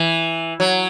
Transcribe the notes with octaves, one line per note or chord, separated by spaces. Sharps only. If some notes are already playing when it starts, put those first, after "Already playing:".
Already playing: E3
F#3